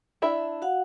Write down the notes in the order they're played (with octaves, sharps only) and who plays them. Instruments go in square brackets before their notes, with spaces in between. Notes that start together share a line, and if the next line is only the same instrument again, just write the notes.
[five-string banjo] D4 E4 E5
[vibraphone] F#4 F5 F#5